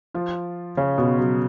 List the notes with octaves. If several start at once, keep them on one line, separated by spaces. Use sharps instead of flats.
F3 F4
C#3 C#4
B2 B3
F#3